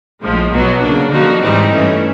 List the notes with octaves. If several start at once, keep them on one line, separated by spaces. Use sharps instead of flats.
A#1 A2 F3 G#3
B1 B2 F#3 B3
C#3 F#3 A#3 D4
D3 F3 A#3 D#4 F#4
G#2 E3 G3 C4 D#4
G2 E3 A3 C#4